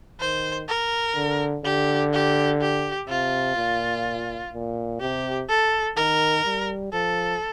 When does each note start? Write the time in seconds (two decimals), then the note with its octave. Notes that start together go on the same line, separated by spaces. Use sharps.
0.20 D#3 C5
0.69 A#4
1.16 D3
1.65 D3 G4
2.13 G4
2.61 G4
3.09 C3 F4
3.57 A#2
4.53 A#2
5.01 C3 G4
5.49 A4
5.97 D#3 A#4
6.45 G3
6.93 F3 A4